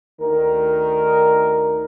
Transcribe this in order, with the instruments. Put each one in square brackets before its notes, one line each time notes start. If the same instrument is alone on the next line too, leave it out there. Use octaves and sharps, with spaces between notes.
[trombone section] D2 D#3 A#4